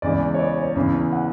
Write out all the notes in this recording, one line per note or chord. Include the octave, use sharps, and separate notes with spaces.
E2 C#3 E3 G#3 D5
C#5
D5
C#5
E2 C#3 E3
F#5